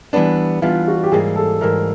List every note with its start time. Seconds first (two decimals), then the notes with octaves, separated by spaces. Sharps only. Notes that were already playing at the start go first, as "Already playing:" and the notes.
0.13 E3 G3 B3 D4
0.62 E3 G3 B3 D4 F4
0.88 F#4
1.03 G4
1.12 G#2 E3 G3 A#3 G#4
1.36 A4
1.61 G#2 E3 G3 A#3 A#4